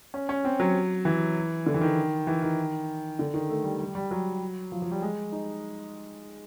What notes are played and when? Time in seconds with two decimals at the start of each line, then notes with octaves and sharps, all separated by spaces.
0.14 C#4
0.29 C#4
0.45 C4
0.60 F#3
1.05 E3
1.66 D3
1.74 E3
1.81 D#3
2.27 E3
2.42 D#3
3.19 D3
3.34 D#3
3.50 A3
3.64 G3
3.79 G3
3.95 G3
4.11 F#3
4.72 F3
4.82 F3
4.91 G3
5.02 G#3
5.32 D#4